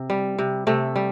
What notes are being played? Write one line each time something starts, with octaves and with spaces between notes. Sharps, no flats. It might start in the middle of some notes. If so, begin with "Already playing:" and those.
Already playing: C3
G3
C3
C3 A3
G3